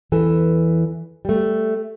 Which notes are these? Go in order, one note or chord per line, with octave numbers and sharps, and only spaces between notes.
E2 E3 A4
G3 A3